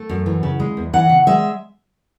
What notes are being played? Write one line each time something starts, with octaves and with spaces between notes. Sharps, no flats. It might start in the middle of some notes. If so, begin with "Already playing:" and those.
Already playing: A3
F#2
E3
C#3
G#3
E2
E3 F#5
C#3
G#3 E5